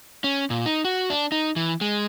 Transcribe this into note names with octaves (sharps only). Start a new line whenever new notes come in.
C#4
A#2
D#4
F#4
D4
D#4
E3
G#3